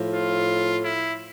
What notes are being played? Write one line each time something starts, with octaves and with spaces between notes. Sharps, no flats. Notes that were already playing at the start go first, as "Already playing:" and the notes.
Already playing: A2 F3
F4
E4